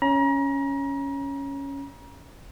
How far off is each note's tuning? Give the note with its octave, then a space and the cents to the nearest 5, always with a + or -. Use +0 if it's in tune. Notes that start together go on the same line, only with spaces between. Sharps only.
C#4 +0 A#5 +35